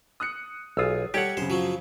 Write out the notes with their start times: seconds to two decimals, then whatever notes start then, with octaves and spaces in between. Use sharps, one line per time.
0.20 D#6 F#6 C#7
0.77 B1 F4 G#4 D#6 E6
1.14 G3 G4 A4 C#5 F#5 G#6
1.37 F#2 C#3 C5
1.50 F3 F#3